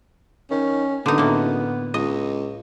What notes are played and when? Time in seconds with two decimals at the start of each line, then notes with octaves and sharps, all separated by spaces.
0.51 D#3 C#4
1.06 F#1 D3 B3 D#4
1.18 A2 A#3
1.94 C#2 D#5